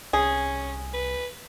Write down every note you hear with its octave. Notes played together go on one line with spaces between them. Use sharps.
C2 C#4 G#4
B4